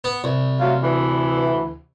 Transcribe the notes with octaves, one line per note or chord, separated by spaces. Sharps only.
B3
C2
F#3 A3 F4
D2 E3